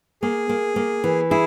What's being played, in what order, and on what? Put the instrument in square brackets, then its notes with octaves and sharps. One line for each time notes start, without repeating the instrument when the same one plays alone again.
[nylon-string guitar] A#3 [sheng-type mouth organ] G#4
[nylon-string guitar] A#3
A#3
E3
[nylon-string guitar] E4 [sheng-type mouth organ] G#4